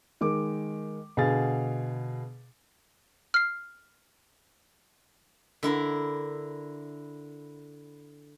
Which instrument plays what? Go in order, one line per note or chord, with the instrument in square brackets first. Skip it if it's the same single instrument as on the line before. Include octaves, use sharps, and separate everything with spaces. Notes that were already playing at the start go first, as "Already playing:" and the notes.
[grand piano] D#3 G#3 D6
B2 D3 G#4 F5 A6
[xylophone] F6 C7
[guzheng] D3 E4 A#4